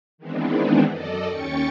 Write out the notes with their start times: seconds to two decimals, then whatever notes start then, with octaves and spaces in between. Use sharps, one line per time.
0.18 D#3 E3 G#3 B3 C4 D4
0.87 F#2 A4 D5 D#5
1.28 D#2 C#4 G5 C#6 A6 C#7